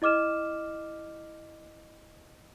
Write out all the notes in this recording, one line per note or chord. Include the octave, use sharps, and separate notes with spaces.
E4 D#5 D6 F6 E7